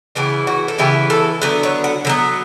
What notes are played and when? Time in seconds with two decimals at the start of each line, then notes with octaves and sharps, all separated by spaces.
0.15 C#3 E3 B3 E4 G4
0.47 F#4
0.68 A4
0.78 C#3 E3 B3 E4 G4
1.10 A4
1.42 D3 F#3 B3 B4
1.63 C#5
1.84 F#5
2.05 D3 F#3 B3